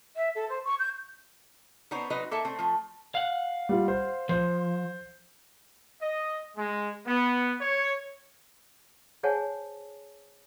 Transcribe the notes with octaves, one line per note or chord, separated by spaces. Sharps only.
E5
A4
C5
C#6
G6
B3 C4 D#4 C5 C#5
F#3 C4 D#4 F#4 B4 D#5
A#3 A4 E5 A5
A3 C4
F3 A3
F5 F#5
G3 F4
C5
F3 C5
D#5
G#3
B3
C#5
G#4 C5 C#5 F#5 G#5 A5